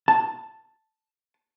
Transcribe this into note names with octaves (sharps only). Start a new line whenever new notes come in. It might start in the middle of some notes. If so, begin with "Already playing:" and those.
A5